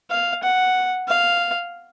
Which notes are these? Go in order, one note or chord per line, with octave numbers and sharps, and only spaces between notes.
F5
F#5
F5